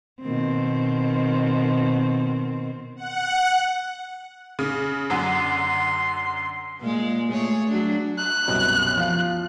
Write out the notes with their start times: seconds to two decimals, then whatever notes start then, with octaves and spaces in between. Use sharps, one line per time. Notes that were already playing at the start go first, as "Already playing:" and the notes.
0.22 B2 D#3 C4
2.96 F#5
4.59 C#3
5.10 F#2 D3 F#3 C6
6.80 A#2 G#3
7.32 A3 G#4 C#5
7.68 F#3 D4
8.18 F#6
8.48 C2 F#2 B2
8.97 F3 F5